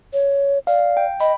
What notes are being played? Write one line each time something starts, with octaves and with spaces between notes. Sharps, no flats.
C#5
D5 F5
G5
D#5 B5